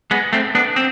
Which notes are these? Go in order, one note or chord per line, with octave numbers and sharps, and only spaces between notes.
G#3 B3
A3 C4
B3 D4
C4